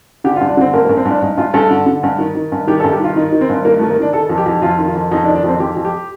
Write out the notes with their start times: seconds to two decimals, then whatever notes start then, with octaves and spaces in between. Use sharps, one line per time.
0.24 D3 G4
0.36 F4
0.41 G2
0.49 D4
0.57 D3 C4
0.74 G2 A#3
0.85 A#3
0.89 G2
0.97 C4
1.05 G2 D4
1.22 G2 D#4
1.37 G2 F4
1.54 G2 A4
1.71 D3
1.86 D3
2.03 G2
2.19 D#3
2.35 D#3
2.52 G2
2.67 D#3 G4
2.80 A4
2.84 G2
2.92 G4
3.00 D#3 F4
3.16 D#3 D#4
3.32 D#3
3.41 C4
3.50 G2
3.65 D#3 A#3
3.78 A3
3.81 D#3
3.90 A#3
3.98 D#3 D4
4.13 D#3 A4
4.29 F2
4.38 G4
4.46 F2
4.62 F2 F4
4.79 D#3
4.87 F4
4.95 F2
5.12 F2 D#4
5.24 D4
5.27 D#3
5.35 D4
5.44 F2 C4
5.60 F2 G4
5.77 F2
5.85 G4